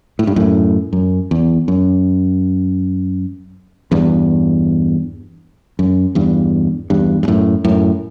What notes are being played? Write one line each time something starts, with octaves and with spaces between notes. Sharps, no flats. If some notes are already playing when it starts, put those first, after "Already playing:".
A2
G2
F#2 A2
F#2
E2
F#2
E2 G2
F#2
E2 G2
E2 G2
G2
F#2 A2
F#2 A2